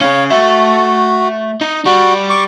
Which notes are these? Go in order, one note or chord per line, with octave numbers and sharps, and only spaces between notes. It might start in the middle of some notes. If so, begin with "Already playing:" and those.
C#4 G#4 C#5 F5
A3 F#4 E5
D#4
G3 F#4
C#6 D6